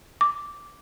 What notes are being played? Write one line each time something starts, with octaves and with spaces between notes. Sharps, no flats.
D6